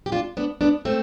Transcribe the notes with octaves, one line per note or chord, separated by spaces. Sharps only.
G4
D4 F4
B3 D4
B3 D4
A3 C4